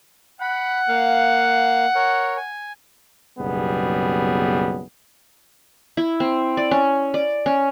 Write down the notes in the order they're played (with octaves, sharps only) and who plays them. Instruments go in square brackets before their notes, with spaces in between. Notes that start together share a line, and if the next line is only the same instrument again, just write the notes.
[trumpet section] F#5 [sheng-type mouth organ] B5
[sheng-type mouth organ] A#3 F5
A#4 C#5
G#5
[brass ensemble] F#1 B1 G3 B3 G#4
[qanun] E4
C4
D5
C#4
D5
C#4